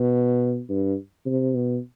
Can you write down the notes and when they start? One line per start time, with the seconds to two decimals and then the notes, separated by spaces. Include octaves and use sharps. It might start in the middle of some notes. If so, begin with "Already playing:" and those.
Already playing: B2
0.69 G2
1.26 C3
1.55 B2